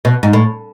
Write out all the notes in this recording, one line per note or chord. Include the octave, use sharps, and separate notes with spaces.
B2
G#2
A2